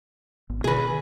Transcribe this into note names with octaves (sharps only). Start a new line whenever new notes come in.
G#1 B3
B2 D3 D#3 G#4 B4